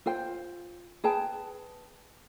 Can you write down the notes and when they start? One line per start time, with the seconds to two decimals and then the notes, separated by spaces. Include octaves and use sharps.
0.06 F4 C5 G5
1.04 G#4 B4 G5 A5